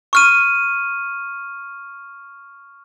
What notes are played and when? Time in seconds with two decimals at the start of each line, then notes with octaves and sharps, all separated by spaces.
0.13 C#6 F6 D#7